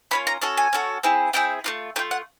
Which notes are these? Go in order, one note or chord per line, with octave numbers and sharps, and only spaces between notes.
A#3 C#4 F4 B5
A#5
C#4 F#4 A4 A5
G#5
C#4 F#4 A4
C4 E4 G#4
C4 E4 G#4 G5
A3 D4 F4
A3 D4 F4 G5
F#5